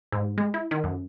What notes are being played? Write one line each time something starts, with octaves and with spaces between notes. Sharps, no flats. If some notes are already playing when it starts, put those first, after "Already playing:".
G#2
G#3
E4
D#3
F#2